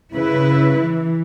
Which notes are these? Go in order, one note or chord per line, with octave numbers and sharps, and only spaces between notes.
C#3 E4 B4
E3